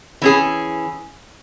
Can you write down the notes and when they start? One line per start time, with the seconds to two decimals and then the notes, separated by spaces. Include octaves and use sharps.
0.22 E3 C#4 G#4